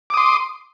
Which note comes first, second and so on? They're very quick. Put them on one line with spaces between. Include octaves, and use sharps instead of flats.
D6 D#6 C6